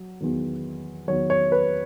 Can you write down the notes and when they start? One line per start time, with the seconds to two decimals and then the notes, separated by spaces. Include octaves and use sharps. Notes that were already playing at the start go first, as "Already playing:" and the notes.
Already playing: F#3
0.21 E2 D#3 F#3
1.08 E2 D#3 F#3 C#5
1.30 C#5
1.52 B4